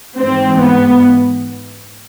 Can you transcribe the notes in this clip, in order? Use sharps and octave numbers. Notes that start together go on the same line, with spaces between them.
G#2 E3 C4
B3